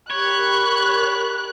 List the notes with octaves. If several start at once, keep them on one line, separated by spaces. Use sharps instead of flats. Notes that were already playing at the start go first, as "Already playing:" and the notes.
G4 A#4 C#5 B5 F#6